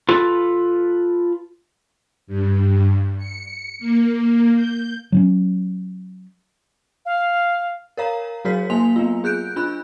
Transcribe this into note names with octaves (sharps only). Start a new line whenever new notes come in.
F4 A4 B4
G2
C#7
A#3
G6
F#3 C4 C#4
F5
A#4 C#5 F5 A#5
F#3 F#4 G#4 A#4 C#5 B6
F#3 A#3 G#5 C6 F7
B3 F4
G#4 F#6 G6 D7
D4 F4 B5 F#6